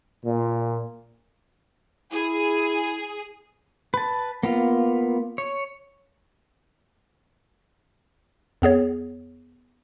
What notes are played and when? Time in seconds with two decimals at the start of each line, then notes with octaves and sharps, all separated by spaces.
0.25 A#2
2.12 E4 G#4
3.94 B4 A5
4.43 A#3 B3 F4
5.38 C#5
8.62 F2 B3 G#4 C#5